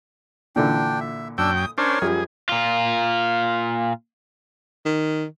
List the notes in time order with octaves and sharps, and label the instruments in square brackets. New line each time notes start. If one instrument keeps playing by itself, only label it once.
[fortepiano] A#2 D3 E3 [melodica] D4 G5
[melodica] E5
[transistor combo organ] F#2 G5 [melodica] D4 E6
[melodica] D#6
[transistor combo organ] C#4 D4 C5 [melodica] A#4 C#5
[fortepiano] F#2 F3 G3 [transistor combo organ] G#4
[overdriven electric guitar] A#2 F4
[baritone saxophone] D#3